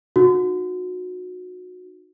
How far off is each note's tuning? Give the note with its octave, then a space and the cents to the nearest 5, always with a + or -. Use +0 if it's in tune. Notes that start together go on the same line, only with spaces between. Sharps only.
D#4 -20 F#4 -25